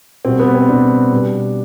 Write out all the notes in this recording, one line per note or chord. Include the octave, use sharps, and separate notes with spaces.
B2 G3 C4
B3
C4
B2 G3 D4
B2 G3